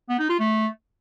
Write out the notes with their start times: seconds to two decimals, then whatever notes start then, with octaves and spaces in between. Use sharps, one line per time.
0.09 B3
0.19 D#4
0.29 F4
0.39 A3